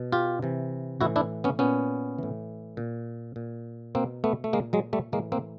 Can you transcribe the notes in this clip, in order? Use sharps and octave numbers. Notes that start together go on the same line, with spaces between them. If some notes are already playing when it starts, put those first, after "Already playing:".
Already playing: B2
F4 G4
C3 E3
A2 E3 E4 F#4
D4 E4
B3 C#4
A#2 B3 C#4
A2 E3
A#2
A#2
B2 A#3 C4
A3 B3
A3
A#2 G#3 A#3
F#3 G#3
G3 A3
A2 E3 G#3 A#3
A#3 C4